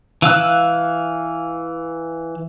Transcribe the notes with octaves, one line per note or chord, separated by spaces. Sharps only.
E3 F5 E6 F#6